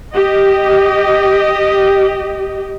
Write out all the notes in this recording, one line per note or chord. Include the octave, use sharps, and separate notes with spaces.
G4 D#5